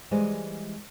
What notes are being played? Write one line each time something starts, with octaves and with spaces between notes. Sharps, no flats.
E3 G3 G#3 C5 D5 D#5